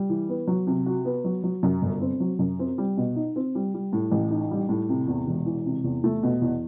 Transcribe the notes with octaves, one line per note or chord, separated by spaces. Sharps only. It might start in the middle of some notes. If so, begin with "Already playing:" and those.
Already playing: G3
E3
B3
F#3
C3
F#4
B3
F#3
F#3
F#2
G1
C4
F#3
F#2
C4
G3
B2
D#4
C4
G3
G3
A2
A1
D#4
G3
A2
C3
E2
E1
E3
C3
E2
A3
B2
E2